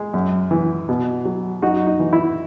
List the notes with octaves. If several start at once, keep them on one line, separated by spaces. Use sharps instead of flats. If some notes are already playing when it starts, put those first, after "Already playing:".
Already playing: G#3
F#2
E3
B2
F#3
F#2 D#4 F#4
D#4
E3
E4